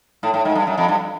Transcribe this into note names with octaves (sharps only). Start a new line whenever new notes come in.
A2
A2
G#2
G2
F#2
F2
G2